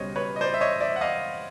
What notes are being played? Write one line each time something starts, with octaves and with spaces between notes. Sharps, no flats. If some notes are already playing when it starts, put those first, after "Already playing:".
Already playing: C#2 B2 G3 C5 C#5 D#5
B4 C#5
D#5
C5 D5
E5
C#5 D#5
D5 E5
F#5
D#5 F5